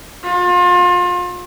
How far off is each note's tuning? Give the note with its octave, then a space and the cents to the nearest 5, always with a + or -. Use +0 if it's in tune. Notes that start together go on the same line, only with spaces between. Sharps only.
F4 +35